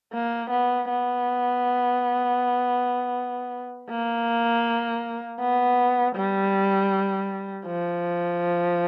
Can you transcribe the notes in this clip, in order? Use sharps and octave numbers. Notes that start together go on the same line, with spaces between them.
A#3
B3
B3
A#3
B3
G3
F3